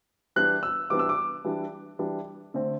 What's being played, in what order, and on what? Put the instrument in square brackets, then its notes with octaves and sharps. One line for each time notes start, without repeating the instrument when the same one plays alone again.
[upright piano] E3 G3 B3 D4 F#6
E6
E3 G3 B3 D4 D6
E6
D6
E3 G3 D4
E3 G3 D4
D3 A3 C4